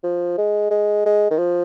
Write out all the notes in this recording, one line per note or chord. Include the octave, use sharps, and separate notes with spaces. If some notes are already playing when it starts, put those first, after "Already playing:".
F3
G#3
G#3
G#3
D#3
F3